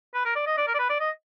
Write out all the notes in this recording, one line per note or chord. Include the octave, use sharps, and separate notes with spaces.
B4
A#4
D5
D#5
D5
A#4
D5
B4
D5
D#5